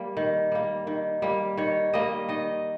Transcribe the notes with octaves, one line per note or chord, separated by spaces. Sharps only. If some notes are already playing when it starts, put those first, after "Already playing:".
Already playing: G3 A#3
D#3
G3 A#3
D#3
G3 A#3
D#3 C#5
G3 A#3 D#5
D#3 D#5